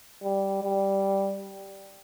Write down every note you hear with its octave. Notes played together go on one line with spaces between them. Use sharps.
G3
G3